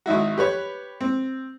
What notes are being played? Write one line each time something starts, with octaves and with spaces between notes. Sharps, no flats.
G#1 D#4 E4 F#4
G4 B4 C#5
C4